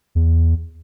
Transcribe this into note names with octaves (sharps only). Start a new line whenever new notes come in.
E2